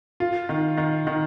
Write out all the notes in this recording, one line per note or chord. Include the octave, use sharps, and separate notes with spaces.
F4
D#3
D#3
D#3